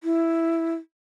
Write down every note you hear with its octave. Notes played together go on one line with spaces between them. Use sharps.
E4